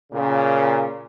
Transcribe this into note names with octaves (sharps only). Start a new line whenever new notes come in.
A#2 C#3